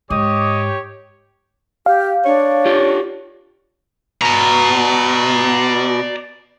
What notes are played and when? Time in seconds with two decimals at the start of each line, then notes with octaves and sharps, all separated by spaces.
0.10 G#2 G4 C#5 D#5 D6 D#6
1.86 G4 F5
2.25 D4 C#5
2.66 F4 G4
4.22 B2 D5 A#5